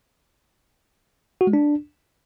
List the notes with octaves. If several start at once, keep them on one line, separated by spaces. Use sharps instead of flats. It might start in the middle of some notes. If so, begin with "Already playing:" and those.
F#4
G#3
D4